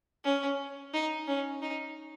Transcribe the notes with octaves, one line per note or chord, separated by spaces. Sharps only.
C#4
D#4
C#4
D#4